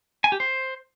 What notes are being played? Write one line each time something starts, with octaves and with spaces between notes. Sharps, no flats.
G#5
G4
C5